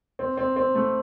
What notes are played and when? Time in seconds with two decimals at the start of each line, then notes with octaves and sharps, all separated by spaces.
0.19 C4
0.38 C4
0.56 C4
0.75 A3